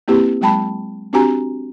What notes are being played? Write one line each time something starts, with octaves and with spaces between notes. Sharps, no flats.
A#3 C4 E4 G4 B4
F#3 G#3 G5 A5 B5
C4 D4 F#4 G4 G#5 A#5